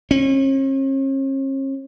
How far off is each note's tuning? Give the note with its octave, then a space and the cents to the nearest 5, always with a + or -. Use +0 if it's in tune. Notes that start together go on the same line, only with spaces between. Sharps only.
C#4 -45